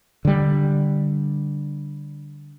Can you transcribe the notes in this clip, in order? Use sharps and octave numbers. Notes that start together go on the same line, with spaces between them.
D3 G3